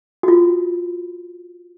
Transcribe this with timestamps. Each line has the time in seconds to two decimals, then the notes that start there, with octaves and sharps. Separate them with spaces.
0.23 F#4
0.28 F4